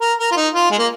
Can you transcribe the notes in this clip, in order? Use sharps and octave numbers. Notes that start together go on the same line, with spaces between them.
A#4
A#4
F4
D#4
F4
G#3
A#3